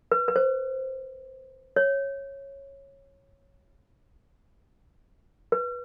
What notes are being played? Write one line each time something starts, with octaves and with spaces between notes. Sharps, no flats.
B4
B4
C5
C#5
B4